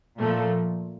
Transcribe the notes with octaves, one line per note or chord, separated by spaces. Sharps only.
A#2 F3 A3